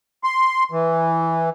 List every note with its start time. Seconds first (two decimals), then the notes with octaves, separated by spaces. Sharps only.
0.24 C6
0.72 E3